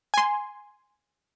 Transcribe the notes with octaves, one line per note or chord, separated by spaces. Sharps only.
G#5 C6